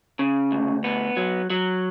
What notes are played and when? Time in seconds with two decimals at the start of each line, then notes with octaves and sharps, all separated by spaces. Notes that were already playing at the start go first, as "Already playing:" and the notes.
0.19 C#3
0.52 D2
0.84 B3
1.17 F#3
1.50 F#3